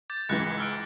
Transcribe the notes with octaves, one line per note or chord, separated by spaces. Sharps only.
D6 G6 A6
C#2 G#2 E3 F#6 A#6 C#7
E6 F6 D7